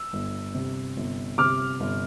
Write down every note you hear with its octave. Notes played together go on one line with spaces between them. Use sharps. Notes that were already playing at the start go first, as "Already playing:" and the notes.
Already playing: E6
G1
C3
G1
C3 D6 F6
G1